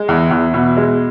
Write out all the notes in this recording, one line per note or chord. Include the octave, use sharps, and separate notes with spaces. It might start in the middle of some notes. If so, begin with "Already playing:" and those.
Already playing: G#3
E2
E2
B2
G#3